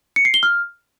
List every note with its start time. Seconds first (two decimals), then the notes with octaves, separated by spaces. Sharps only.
0.16 C#7
0.25 C7
0.34 G7
0.43 F6